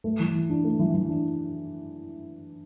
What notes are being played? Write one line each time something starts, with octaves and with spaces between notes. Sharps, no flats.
A3
E3
E3
D4
A3
E3
E3
D4